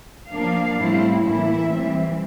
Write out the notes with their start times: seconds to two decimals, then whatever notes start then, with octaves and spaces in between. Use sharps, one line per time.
0.30 F3 A#3 D4 F5
0.78 A2 G3 C4 E4
1.25 A2 E3 A#3 E4 E5
1.73 E3 G3 C4